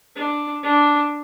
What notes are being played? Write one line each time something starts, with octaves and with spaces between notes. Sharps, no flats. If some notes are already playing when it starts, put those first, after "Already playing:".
D4
D4